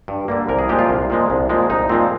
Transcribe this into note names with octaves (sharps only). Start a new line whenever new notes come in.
G2
D3 G3 A#3
C2 A#4
G#4
A#2 F3 G#3 G4
F4
C2
A#2 F3 G#3
C2
A#2 F3 G#3
C2 D#4
A#2 F3 G#3 C4